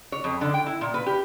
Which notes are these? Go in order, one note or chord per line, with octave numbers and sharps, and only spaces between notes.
C#5
F2
D3
G5
E4
A#2
B4
G4